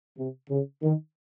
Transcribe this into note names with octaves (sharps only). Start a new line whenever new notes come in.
C3
C#3
D#3